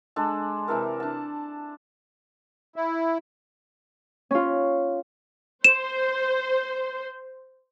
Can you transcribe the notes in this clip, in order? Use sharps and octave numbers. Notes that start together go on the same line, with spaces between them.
G#3 D4 A4
C3 E3 A4 A#4
D4 A5
E4
C#4 F4
C5 E7